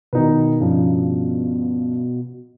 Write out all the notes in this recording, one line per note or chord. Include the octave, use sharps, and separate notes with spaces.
B2 D#3 D#4 B4
G2 C#3 F3